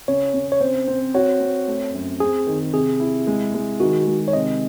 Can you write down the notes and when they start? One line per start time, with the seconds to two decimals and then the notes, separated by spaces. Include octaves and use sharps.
0.08 C#3 C#5
0.34 C#3
0.52 C#5
0.60 C4 C5
0.88 C4
1.14 F#4 C#5
1.40 C4
1.68 A3
1.94 F#2
2.20 C4 G#4
2.47 D#3
2.74 C3 G#4
3.00 E4
3.27 G#3
3.54 G#3
3.80 D#3 F#4
4.07 G#3
4.28 C#5
4.33 C3 D#5